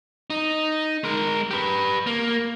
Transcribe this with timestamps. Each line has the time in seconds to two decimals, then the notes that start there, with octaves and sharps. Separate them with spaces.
0.30 D#4
1.04 G#3 A#4
1.51 G4 B4
2.07 A#3